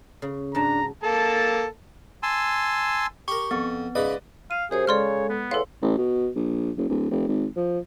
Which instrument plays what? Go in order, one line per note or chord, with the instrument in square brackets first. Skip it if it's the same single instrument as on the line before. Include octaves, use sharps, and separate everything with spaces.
[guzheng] C#3
[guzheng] G#2 F#3 A5 [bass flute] D4 [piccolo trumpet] A#5
[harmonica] A#3 A4 A5
[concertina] G#5 A5 C6 E6
[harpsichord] G4 A#4 [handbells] C#6
[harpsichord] F2 [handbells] B3
[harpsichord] G#2 C#3 B5 [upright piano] B4 D5 D#5
[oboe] F5 [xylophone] D#7
[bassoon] F#2 [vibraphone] G4 C5 C#5 [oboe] G#4
[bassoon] C#3 [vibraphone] G#3 A4 [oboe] C#5 [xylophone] D5 C6 F6
[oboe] B3
[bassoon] E2 [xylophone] A4 F5 [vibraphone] B4 C#5 C6
[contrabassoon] A1
B2
A#1
F#1
D1
F1
G#1
F3